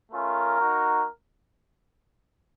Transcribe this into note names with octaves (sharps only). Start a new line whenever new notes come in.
A3 C#4 F4 A#4
A#3 D#4 F#4